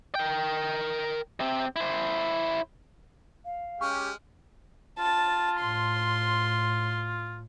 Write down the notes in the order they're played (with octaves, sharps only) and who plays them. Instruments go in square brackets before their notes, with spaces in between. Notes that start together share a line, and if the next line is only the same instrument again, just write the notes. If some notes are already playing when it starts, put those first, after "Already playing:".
[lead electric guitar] A#4 G5
C3 C4
E4 C5
[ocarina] F5
[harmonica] G#3 F6 [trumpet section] C#4 G4 [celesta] C#6
[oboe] F4 [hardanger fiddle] A5
[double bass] A2 [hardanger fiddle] C6